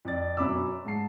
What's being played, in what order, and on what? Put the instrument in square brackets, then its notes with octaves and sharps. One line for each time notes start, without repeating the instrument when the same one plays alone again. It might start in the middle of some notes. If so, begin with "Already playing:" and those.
[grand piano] F2 D5 A6
F#2 B2 C#4 B5 D6 E6
G#2 A5 C7